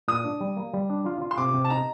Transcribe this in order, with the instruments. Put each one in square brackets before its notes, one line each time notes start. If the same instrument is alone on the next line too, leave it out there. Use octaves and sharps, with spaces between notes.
[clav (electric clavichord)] A#2 [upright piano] D#6
[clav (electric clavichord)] D4
G3
A#3
G3
D4
F4
F4
[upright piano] C6
[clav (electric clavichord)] C3 [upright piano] D6
[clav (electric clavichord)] C3
[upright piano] A5
[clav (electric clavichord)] D#4 [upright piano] A#5